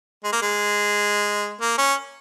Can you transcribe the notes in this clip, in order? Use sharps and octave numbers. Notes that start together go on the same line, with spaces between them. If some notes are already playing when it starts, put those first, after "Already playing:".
G#3
A#3
G#3
A#3
C#4